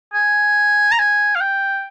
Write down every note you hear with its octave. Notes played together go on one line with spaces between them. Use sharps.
G#5
A#5
G#5
F5
G5